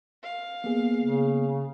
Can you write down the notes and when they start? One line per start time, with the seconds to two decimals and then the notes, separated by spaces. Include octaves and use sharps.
0.23 F5
0.64 A#3 B3 G#4
1.01 C#3